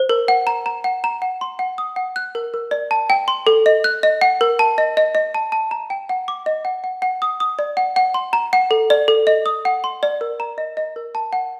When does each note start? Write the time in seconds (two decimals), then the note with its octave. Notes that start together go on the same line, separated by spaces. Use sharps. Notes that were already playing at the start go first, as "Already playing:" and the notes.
Already playing: C5
0.09 A#4
0.28 F#5
0.47 A#5
0.66 A#5
0.84 F#5
1.04 A#5
1.22 F#5
1.41 C6
1.59 F#5
1.78 D#6
1.96 F#5
2.16 F#6
2.35 A#4
2.54 A#4
2.71 D5
2.91 A5
3.10 G5
3.28 C6
3.47 A4
3.66 D#5
3.84 F#6
4.03 D#5
4.21 F#5
4.41 A#4
4.59 A5
4.78 D#5
4.97 D#5
5.15 D#5
5.35 A5
5.52 A5
5.71 A#5
5.90 G5
6.09 F#5
6.28 D6
6.46 D#5
6.65 F#5
6.84 F#5
7.02 F#5
7.22 D#6
7.40 D#6
7.59 D5
7.77 F#5
7.96 F#5
8.14 C6
8.33 A#5
8.53 F#5
8.71 A4
8.90 D5
9.08 A4
9.27 D#5
9.46 D#6
9.65 F#5
9.84 C6
10.03 D5
10.21 A#4
10.40 A#5
10.58 D#5
10.77 D#5
10.96 A#4
11.15 A5
11.33 F#5